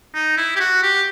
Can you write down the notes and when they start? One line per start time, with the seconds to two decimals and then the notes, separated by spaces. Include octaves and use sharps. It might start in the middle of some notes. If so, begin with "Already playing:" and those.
0.14 D#4
0.37 E4
0.55 G4
0.60 F#4
0.82 G4